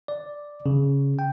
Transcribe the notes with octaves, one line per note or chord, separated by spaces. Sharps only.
D5
C#3
G5